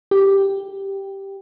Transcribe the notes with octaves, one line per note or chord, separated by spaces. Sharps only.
G4